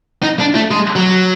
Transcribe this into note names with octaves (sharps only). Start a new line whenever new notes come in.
D#4
D4
A3
G#3
F#3